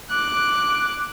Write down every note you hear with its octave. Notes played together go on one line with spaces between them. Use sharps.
D6 F#6